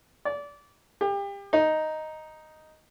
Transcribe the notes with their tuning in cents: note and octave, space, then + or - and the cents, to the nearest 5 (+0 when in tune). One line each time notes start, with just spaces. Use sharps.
D5 -25
G4 +30
D#4 +0